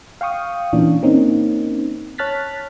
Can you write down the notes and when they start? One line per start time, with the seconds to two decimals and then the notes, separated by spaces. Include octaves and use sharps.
0.21 F5 G5 C#6 D#6
0.73 A#2 E3 C#4 D4
1.02 A#3 C4 C#4 D#4
2.18 C#5 A5 F6 F#6 A6 B6